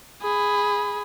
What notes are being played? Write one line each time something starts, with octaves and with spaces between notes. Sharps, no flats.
G#4 B5